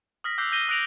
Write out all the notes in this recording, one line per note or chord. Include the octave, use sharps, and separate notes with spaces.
D#6 F6 A#6 B6
D6 E6 F#6 G6 C7
F6 G6 A#6 D#7 G7
D#6 F#6 A#6 D7 F7 F#7